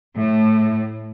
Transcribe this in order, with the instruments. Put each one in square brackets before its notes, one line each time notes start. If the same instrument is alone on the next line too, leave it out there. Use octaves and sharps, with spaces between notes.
[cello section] A2